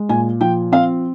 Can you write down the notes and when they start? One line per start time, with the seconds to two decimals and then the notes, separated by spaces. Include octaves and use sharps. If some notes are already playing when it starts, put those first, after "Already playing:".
Already playing: G#3
0.09 A#2 G#5
0.40 F3 G5
0.72 C4 F5